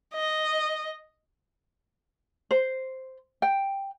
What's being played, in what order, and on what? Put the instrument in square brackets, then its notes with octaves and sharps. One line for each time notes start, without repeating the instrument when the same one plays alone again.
[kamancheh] D#5
[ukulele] C5
G5